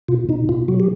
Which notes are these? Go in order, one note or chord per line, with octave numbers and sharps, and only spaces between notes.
B2 F4
B2 D#4
B2 F4
F#3 F#4
G4